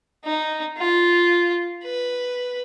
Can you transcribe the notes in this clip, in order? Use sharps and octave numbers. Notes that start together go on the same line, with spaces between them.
D#4
F4
B4